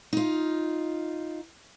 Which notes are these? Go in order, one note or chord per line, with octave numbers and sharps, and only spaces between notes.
D#4 F4